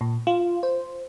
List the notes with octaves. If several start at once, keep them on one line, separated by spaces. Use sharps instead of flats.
A#2
F4
C5